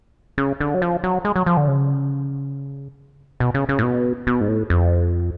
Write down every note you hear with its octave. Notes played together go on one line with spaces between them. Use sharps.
C#3
D3
F#3
F3
F#3
G#3
F#3
F3
D3
C#3
B2
C#3
C#3
A2
B2
B2
G#2
A2
F2